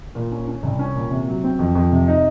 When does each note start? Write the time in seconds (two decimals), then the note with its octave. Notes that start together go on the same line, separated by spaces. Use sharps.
0.15 A#2
0.32 C#4
0.47 C#4
0.63 C2
0.79 C#4
0.96 A#2
1.11 C3
1.28 F#3
1.44 C4
1.59 F2
1.75 F2
1.92 C3
2.08 D#4